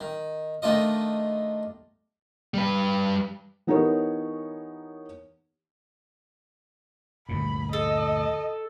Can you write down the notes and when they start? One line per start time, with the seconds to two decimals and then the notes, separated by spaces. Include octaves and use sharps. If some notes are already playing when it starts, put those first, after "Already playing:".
0.01 D#3
0.62 D#3 A3 D4 F4 D#5
2.54 G3 B4
3.67 E3 B3 D#4 G4 A#4 C#5
7.29 D2 G2 A#2 B5
7.73 A4 D#5